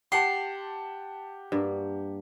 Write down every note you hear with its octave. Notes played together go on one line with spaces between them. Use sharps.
G4 F#5 A5 C6
G2 A#3